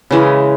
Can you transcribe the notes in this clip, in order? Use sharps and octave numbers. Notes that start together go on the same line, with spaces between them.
C#3 E3 G#3